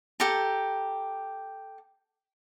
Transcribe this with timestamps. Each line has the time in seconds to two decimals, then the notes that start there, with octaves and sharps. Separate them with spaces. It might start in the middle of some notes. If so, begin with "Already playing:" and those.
0.20 G4 A4 A#5